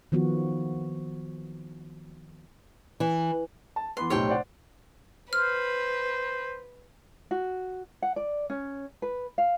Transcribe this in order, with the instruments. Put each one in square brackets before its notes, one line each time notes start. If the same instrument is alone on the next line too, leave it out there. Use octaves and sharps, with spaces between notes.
[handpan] D#3 F3 B3 F#4
[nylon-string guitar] E3
[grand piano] A5
[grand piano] E3 B3 B4 [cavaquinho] C6
[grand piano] B1 A2 C3 [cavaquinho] C#5 G5 C6
[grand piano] C5 D5 F#5
[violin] B4 [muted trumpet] C5 [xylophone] F6
[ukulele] F#4
F#5
D5
C#4
B4
F5